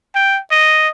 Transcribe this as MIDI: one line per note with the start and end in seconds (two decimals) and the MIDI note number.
0.15 0.40 79
0.51 0.88 75